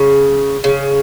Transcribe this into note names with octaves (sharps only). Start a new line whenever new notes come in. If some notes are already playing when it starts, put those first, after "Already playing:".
Already playing: C#3
C#3